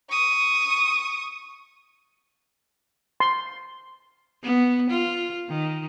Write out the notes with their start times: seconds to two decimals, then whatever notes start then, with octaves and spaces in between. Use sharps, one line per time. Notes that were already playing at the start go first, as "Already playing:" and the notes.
0.10 C#6 D#6
3.20 C6
4.43 B3
4.90 F4
5.49 D#3